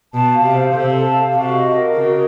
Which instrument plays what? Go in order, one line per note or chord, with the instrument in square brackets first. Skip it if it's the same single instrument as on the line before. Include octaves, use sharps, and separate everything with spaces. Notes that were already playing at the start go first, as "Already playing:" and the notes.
[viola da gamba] B2 [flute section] A5
[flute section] F5
[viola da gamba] C3
[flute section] C5
[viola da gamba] C3 [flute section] A4
[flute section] A5
F5
[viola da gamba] C3 [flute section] F#4
[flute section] D#5
A#4
[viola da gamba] C#3 [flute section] F#4